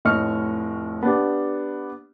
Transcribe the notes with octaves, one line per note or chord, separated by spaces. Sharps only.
F1 A2 D#5 C#6 F6 C#7
B3 D4 G4